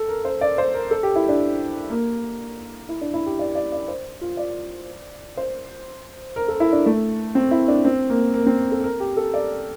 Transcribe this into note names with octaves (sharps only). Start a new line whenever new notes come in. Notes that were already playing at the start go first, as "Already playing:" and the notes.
Already playing: A4
A#4
C5
D5
C5
A#4
A4
G4
E4
D4
A#3
E4
D4
E4
G4
D5
D5
D5
C5
F4
D5
C5
A#4
A4
E4
D4
A3
C4
E4
D4
C4
A#3
A#3
C4
A4
A#4
G4
A4
D5